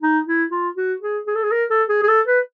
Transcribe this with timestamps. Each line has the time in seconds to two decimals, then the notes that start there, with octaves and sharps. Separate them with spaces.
0.02 D#4
0.27 E4
0.51 F4
0.77 F#4
1.02 G#4
1.27 G#4
1.35 A4
1.43 G#4
1.52 A#4
1.70 A4
1.89 G#4
2.03 G#4
2.08 A4
2.27 B4